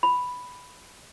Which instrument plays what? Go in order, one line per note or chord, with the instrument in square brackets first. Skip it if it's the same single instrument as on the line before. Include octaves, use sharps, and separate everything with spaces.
[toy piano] B5